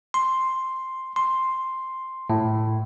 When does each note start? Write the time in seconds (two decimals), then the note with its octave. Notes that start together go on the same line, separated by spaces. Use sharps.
0.14 C6
1.16 C6
2.30 A2